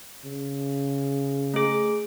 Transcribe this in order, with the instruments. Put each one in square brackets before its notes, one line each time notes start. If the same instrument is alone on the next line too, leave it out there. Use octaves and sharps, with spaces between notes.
[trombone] C#3
[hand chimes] A3 G#4